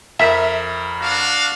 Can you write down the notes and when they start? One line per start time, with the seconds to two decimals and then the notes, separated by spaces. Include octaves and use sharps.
0.19 F2 A#4 E5
1.02 D4 F#4 F5